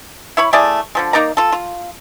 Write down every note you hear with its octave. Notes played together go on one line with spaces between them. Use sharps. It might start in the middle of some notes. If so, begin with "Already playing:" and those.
E4 C#5 B5
A3 E4 G#4 D5
D3 F3 G#3
A#3 D#4 D5 A#5
F4 A4
F4